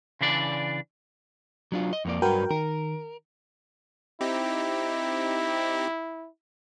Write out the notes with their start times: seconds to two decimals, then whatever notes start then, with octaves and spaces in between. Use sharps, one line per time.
0.21 C#3 E3 D4 D5
1.72 F#3 D4 F4
1.93 D#5
2.05 F2 A#3 D5
2.22 G2 F#3 F#4 A#4 B4 G5
2.51 D#3 A#4
4.21 C4 D#4 E4 G4